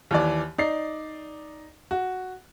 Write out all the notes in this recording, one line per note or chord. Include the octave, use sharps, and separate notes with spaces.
D#2 E3 D5
D#4 D5 C7
F#4